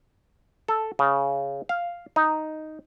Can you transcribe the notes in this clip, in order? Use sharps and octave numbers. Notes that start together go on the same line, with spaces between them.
A4
C#3
F5
D#4